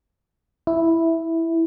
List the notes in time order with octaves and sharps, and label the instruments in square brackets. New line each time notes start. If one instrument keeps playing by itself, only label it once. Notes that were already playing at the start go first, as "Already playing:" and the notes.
[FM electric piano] E4